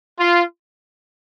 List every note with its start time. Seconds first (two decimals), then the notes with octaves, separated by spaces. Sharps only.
0.19 F4